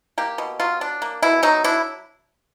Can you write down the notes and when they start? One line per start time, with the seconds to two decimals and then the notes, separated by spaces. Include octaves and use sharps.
0.18 A#3 G4
0.38 B2
0.60 F#3 F4
0.81 D4
1.02 A#3
1.22 B2 E4
1.43 F#3 D#4
1.64 D4 E4